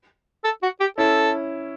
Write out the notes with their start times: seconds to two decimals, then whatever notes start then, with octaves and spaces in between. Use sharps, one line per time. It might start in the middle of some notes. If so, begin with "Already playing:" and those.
0.44 A4
0.63 F#4
0.80 G4
0.98 C#4 E4 A4